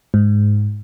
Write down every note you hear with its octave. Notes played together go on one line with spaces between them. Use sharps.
G#2